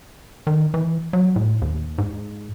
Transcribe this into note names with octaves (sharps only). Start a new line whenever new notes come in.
D#3
E3
F#3
A2
D#2
G#2